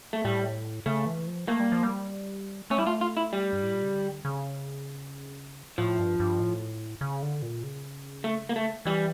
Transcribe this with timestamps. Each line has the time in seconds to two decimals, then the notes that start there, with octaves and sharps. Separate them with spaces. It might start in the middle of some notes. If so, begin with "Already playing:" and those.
0.13 A3
0.25 A2 G3
0.86 C#3 A3
1.06 E3
1.27 F3
1.48 A3 A#3
1.60 G3
1.72 F3
1.83 G3
2.70 A3 C#4
2.78 G3 E4
2.86 A3 F4
3.01 F4
3.17 E4
3.33 G3
3.53 G2
3.63 A2
3.73 A#2
3.83 C#3
3.93 D3
4.25 C#3
5.78 A2 F3
5.99 G2
6.20 G2
6.40 A2
7.01 C#3
7.22 D3
7.42 A#2
7.63 C#3
8.24 A3
8.49 A#3
8.56 A3
8.85 E3 G3